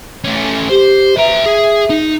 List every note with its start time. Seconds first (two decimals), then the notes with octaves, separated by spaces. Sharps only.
0.24 A3 C#4
0.69 G4 C5
1.17 B4 E5 A#5
1.46 G#4
1.90 D#4